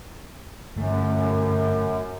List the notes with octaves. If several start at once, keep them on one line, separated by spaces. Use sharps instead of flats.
G1 F#2 A3